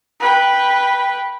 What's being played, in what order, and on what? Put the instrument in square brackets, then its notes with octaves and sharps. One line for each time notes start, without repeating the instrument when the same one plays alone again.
[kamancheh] B4 G5